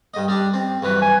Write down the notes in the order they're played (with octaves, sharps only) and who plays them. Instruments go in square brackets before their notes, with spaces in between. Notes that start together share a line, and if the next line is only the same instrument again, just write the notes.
[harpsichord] G2 D#5
G3 D4
C4
[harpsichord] G2 E3 F#3 [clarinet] B4
[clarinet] G#5